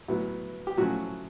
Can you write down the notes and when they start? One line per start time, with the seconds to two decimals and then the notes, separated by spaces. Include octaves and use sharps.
0.08 A2 F#3 B3
0.67 G4
0.77 A2 F3 F#3 A3 C#4 F#4